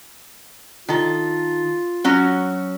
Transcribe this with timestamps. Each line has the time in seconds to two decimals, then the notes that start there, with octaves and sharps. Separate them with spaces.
0.88 D#3 F4 A4
2.04 F#3 C#4 F#4